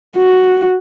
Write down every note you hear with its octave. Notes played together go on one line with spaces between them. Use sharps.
F#4